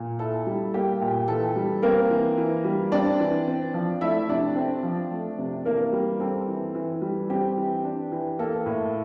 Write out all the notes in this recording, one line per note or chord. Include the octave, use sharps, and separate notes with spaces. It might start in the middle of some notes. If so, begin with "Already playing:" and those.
Already playing: A#2
E4 A4
G3
A#3 G4
A#2
E3 A4
G3
A#3 C4 A#4
E3
E3
G3
C4 D4 D5
E3
C4
F3
A3 E4 E5
C3 D4 D5
C4
F3
A3
C3
E3 A#3 A#4
G3
C4 A4
E3
E3
G3
C4 G4
E3
D4
E3
A#3 A4
A2